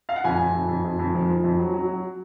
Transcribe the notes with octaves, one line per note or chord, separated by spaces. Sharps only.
F5
F#5
F2 G#5
F2
F2
F2
F2
F2
F3
F3
F2
F#3
F#3
F#3